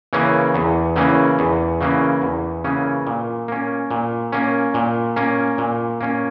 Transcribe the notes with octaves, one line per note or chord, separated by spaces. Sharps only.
C#3 E3 A#3 C#4
E2
C#3 E3 A#3 C#4
E2
C#3 E3 A#3 C#4
E2
C#3 E3 A#3 C#4
A#2
A#3 C#4
A#2
A#3 C#4
A#2
A#3 C#4
A#2
A#3 C#4